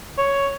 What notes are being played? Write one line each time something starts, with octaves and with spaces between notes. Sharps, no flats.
C#5